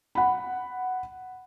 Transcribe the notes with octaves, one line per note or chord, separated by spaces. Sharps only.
F#5 B5